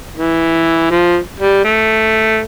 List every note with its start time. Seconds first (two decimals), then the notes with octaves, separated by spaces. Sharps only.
0.17 E3
0.91 F3
1.40 G3
1.64 A3